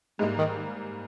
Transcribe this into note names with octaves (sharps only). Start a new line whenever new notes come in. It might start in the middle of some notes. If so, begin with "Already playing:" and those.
G#2 G3 G#3 A#3
D#3